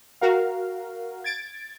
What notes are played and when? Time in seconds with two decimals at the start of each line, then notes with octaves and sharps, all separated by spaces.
0.21 F#4 A#4 F5
1.24 G#6 A6 D7